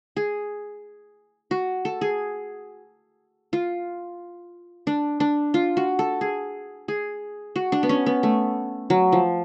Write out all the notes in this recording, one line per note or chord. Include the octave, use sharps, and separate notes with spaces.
G#4
F#4
A4
G#4
F4
D4
D4
F4
F#4
A4
G#4
G#4
F#4
D4
B3
C#4
B3
A3
F#3
F3